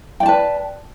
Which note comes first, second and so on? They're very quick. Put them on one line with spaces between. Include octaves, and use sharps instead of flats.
G5 D5 A5 B4